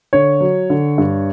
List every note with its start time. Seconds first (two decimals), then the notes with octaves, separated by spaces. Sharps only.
0.13 D3 C#5
0.41 F#3
0.70 D3
0.98 G2